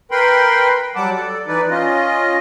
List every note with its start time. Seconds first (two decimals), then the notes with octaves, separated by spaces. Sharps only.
0.11 A#4 B4 G5 B5 C6
0.96 F#3 G3 F#5 A5 D6
1.15 A4 D5
1.47 E3 D#4 B4 D5
1.70 C#4 F4 D#5